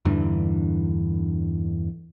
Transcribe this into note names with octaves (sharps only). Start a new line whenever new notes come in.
E2 G2 D3 E3